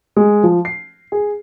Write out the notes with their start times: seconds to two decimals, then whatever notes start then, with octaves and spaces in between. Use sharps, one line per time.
0.17 G#3
0.43 F3
0.65 C7
1.12 G#4